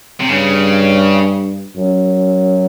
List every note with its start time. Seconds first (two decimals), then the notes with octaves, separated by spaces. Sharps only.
0.20 C3
0.29 G2 C#3
1.76 F#2